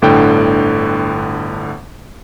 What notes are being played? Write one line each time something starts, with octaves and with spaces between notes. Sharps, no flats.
G1 A2 D3 G5